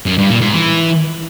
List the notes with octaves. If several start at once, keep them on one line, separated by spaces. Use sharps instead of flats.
F#2
G2
A#2
G#2
E3